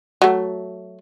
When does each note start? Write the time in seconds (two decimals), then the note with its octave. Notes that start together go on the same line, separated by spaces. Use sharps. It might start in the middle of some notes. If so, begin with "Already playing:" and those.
0.22 F#3 A3